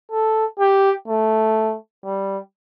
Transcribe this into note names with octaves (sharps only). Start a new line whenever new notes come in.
A4
G4
A3
G3